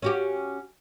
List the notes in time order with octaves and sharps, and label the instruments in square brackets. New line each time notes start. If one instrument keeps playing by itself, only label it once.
[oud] C#4 F#4 G4